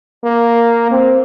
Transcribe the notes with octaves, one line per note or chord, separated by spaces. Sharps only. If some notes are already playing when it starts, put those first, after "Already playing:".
A#3
C4